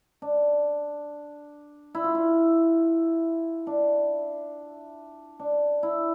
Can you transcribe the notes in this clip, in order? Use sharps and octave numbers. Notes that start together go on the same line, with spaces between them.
D4
E4
F4
E4
D4
D4
E4